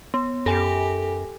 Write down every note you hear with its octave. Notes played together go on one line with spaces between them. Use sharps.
B3
F#2 G4 A4 G#5